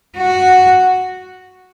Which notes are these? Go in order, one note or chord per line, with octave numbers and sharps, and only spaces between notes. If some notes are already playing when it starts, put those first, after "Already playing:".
F#4